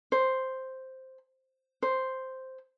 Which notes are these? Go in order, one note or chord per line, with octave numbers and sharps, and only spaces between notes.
C5
C5